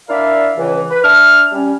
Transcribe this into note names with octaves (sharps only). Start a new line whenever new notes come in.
D4 E4 A#4 D5 E5 F5
C#2 E3
B4
D4 E5 A5 F6
G3 C#4